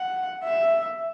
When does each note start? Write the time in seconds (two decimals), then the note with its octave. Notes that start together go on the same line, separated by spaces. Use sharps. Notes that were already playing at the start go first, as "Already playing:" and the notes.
Already playing: F#5
0.44 E5